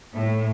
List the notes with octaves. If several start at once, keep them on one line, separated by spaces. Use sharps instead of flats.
A2